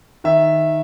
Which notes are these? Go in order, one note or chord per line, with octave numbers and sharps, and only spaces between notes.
D#3 E5